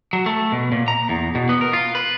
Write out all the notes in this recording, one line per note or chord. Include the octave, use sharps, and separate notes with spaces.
F#3
A3
B2
A#2
A#5
E2
B2
B3
A#4
F4
B4